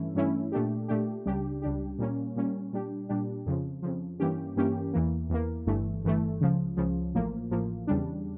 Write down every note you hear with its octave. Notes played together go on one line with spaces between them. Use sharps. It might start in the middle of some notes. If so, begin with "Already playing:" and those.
Already playing: G2 E3 A3 C#4 E4
G2 E3 A3 C#4 E4
A#2 A3 D4 G4
A#2 A3 D4 G4
C#2 C#3 G3 D4 G4
C#2 C#3 G3 D4 G4
A#2 G3 A#3 C#4
A#2 G3 A#3 C#4
A#2 G3 D4 G4
A#2 G3 D4 G4
F2 C#3 F3
F2 C#3 F3
G2 E3 A#3 C#4 G4
G2 E3 A#3 C#4 G4
E2 E3 A#3
E2 E3 A#3
G1 G2 E3 A3
G1 G2 E3 A3
C#2 C#3 F3
C#2 C#3 F3
A1 A2 F3 A#3
A1 A2 F3 A#3
E2 C#3 G3 D4